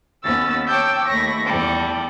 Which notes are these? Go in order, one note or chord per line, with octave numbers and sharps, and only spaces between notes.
D#2 B3 C#4 E6 A6
C#5 G5 A5 D6 E6 G6
D#2 A3 B5 C#6 A#6
E2 G3 A4